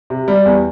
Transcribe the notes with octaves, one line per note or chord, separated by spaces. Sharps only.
C3
G3
E2